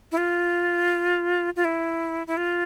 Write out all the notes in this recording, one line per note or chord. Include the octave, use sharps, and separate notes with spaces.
E4
F4
F4
E4
E4
F4